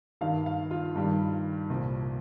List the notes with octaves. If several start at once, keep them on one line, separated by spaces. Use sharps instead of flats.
G2 D#3 G3 F5
F5
F4
G2 D#3 G3
C2 A#2 F3